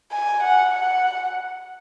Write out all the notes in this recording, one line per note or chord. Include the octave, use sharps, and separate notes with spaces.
G#5
F#5
F#5